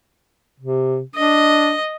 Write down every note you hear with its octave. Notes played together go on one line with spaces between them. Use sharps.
C3
D4 D#5